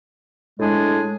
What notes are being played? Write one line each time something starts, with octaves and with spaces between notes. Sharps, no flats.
A2 G#3 D4 G#4